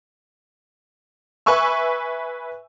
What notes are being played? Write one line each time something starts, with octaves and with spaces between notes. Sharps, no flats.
B4 E5 G#5 C#6 E6